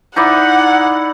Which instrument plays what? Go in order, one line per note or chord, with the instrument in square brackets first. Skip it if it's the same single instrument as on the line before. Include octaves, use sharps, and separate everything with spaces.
[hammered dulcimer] D#4 E4 D5 [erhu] F#5